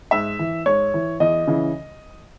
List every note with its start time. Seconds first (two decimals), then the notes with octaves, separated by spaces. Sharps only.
0.11 G#2 E5
0.39 E3
0.66 G#2 C#5
0.94 E3
1.20 E2 D#5
1.47 C#3 E3